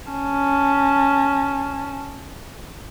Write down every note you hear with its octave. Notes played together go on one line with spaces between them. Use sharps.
C#4 A5